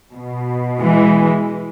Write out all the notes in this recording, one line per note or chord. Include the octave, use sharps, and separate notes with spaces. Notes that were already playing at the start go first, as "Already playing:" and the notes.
B2
E3 G#3